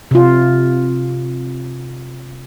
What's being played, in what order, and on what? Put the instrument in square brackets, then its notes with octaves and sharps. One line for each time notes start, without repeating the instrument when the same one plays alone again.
[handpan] C3 F4